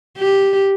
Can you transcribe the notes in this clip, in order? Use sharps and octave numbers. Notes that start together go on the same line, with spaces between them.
G4